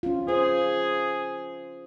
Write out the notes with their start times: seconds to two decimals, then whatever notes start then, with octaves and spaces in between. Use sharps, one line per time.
0.03 C#4 F4
0.28 G#4 C5